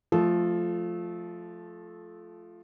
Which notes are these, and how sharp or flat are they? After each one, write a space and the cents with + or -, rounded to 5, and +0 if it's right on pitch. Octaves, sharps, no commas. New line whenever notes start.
F3 +0 A3 -20 A4 -25